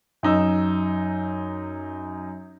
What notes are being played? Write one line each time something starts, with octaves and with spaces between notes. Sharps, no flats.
F#2 D#4 E6